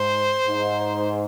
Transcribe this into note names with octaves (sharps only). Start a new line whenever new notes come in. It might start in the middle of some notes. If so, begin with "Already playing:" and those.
Already playing: G#2 C5
G#2